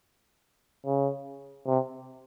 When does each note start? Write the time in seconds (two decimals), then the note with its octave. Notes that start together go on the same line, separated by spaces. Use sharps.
0.86 C#3
1.67 C3